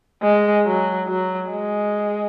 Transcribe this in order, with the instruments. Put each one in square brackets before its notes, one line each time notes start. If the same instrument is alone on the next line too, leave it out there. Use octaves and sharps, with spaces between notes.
[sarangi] G#3
F#3
F#3
G#3